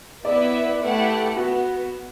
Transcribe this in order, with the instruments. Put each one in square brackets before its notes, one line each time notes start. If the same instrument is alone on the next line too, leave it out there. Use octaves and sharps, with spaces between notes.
[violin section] B3 E4 B4 E5 [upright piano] D5
[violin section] A3 E4 G4 B4 F#5
[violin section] B3 [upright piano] F#4